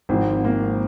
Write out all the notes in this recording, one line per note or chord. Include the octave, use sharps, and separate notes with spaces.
G#1 G#2 F3 C4
A#3